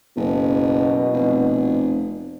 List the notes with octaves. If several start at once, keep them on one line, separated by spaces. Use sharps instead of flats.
F#1 B2
F1